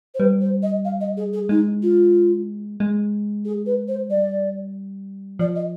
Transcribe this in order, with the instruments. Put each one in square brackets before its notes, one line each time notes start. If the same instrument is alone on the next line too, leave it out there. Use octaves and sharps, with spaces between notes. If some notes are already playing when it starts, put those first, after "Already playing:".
[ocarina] C5
[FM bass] G3 [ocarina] B4
[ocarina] C5
D#5
F5
D#5
G#4
G#4
[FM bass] G#3 [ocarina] D#4
[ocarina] F4
[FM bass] G#3
[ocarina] G#4
B4
C5
[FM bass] G3 [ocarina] D5
[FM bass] F3 [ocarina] D5
[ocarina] D#5